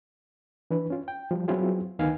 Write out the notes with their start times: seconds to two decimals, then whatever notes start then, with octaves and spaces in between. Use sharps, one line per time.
0.71 E3 D4 B4
0.90 C#4 F4
1.08 G5
1.31 F3 G3
1.48 F#3 B3 C4 E4 F4 G#4
1.99 D2 D#3 B3 D#4 F5 G#5